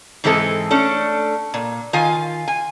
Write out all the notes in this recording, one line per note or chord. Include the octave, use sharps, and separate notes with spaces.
G#2 E3 G#3 C4 A4
A3 C#4 D4
A#2
D#3 F4 F5 G#5
G#5